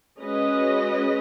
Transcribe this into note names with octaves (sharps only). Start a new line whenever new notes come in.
G#3 C#4 F#4 B4 D#5